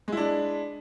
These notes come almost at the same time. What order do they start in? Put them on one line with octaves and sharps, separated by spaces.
G#3 E4 D4